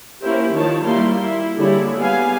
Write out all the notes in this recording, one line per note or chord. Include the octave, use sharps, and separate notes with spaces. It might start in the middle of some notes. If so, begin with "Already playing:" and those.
A#3 C#4 E4 G4 A#4 C5
D#3 F3 C#5 A5
G3 A#3 E4 C6
E4
D3 G3 A#3 E4 G#4 C#5
G3 B3 F5 G#5